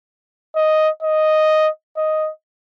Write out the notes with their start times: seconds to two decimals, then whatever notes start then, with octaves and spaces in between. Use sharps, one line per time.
0.56 D#5
1.03 D#5
1.97 D#5